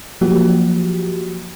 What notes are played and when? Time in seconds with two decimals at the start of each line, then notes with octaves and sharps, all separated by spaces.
0.21 F3 F#3 A#3 F#4 G4